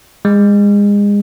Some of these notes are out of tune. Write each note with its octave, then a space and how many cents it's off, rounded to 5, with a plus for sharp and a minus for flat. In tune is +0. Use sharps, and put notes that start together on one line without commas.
G#3 -30